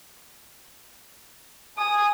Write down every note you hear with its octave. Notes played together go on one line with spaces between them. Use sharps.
G#5 D#6